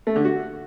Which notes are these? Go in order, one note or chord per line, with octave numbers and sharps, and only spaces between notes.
A3
D3
F#4